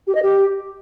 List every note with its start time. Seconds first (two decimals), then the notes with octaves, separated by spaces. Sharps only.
0.07 G4
0.15 D#5
0.22 G4